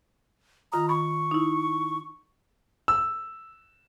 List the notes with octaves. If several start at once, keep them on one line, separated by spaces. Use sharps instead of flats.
D#3 F4 A#5 D#6
B5 C#6
D#4 E4
E6